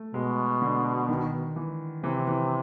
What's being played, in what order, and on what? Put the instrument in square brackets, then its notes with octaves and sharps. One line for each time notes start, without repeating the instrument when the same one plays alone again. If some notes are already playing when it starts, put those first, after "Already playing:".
Already playing: [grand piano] A3
[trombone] B2 [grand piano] G#3
[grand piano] D3
D#3
E3
[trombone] C3 [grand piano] E3
[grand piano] E3